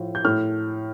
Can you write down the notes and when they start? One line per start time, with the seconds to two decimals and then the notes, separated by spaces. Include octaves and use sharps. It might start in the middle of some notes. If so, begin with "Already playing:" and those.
Already playing: A2 F3
0.15 G6
0.25 A2 F6